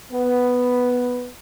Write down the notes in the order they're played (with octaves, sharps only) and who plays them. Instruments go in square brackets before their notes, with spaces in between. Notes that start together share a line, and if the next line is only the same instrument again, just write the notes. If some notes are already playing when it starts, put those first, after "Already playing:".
[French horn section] B3